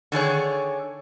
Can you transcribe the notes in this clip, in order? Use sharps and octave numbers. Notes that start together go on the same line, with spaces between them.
D3 D#3 G#4 C#5